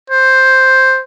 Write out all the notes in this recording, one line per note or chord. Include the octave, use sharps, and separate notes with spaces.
C5